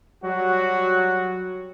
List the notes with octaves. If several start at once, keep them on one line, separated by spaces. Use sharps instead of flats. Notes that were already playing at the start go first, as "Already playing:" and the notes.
F#3 G3 F#4